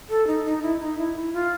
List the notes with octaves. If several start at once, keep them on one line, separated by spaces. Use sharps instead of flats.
A4
D#4
D#4
E4
D#4
E4
E4
F4